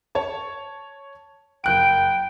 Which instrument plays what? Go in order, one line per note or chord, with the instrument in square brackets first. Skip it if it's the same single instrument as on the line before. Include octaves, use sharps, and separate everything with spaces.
[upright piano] C#5 A5 C#6
[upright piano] F#1 F#6 D7 [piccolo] G5